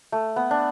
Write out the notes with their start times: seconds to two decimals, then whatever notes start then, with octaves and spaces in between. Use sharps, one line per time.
0.12 A3
0.36 B3
0.51 D4